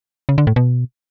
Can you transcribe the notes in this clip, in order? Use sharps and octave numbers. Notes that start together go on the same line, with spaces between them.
C#3
D3
A2
B2